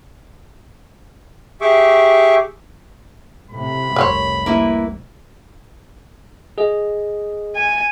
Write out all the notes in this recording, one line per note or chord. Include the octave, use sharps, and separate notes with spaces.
G4 G#4 E5 C#6 D6
A2 C3 B5
F1 C2 A#4 C5 C#5
A#3 E4 B4
G#4 D#5
G#5